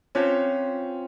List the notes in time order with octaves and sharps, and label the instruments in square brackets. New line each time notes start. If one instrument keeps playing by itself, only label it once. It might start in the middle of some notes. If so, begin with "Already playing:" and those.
[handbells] C4 F4 C5 F5 A5 [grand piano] C#4